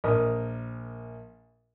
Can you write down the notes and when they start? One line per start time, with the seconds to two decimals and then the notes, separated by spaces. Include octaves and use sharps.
0.04 A#1 A#4 D#6